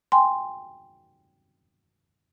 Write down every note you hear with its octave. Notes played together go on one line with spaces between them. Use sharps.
G5 G#5 C6